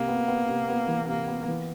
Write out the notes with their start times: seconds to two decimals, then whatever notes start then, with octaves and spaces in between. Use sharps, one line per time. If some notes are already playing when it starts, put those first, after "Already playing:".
Already playing: C3 A#3
0.08 B3
0.28 B3
0.48 C3
0.68 B3
0.88 E3
1.07 C3 A#3
1.28 B3
1.48 E3